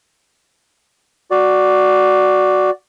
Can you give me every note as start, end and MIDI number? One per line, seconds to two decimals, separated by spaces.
1.31 2.70 66
1.31 2.70 74